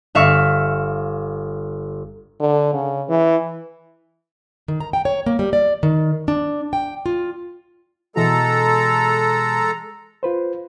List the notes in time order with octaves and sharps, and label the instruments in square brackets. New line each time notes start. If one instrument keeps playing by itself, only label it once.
[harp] G1 E5 F5 C#6
[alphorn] D3
C#3
E3
[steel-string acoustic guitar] D#3
A#5
G5
C#5
A#3
G3
D5
D#3
D4
G5
F4
[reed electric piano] B2 E3 F#4 [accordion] G#3 A4 A#5
[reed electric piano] F4 B4 C5